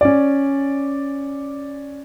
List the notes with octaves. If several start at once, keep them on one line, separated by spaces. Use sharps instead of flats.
C#4 D5